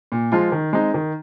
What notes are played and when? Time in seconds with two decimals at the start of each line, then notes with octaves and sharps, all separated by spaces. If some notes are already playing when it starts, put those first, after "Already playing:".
0.12 A#2
0.32 F3 G#3 F4
0.52 D#3
0.73 G#3 C4 D#4
0.94 D#3